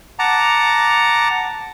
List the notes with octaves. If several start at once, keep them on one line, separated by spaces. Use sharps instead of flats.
F#5 A5 A#5 D6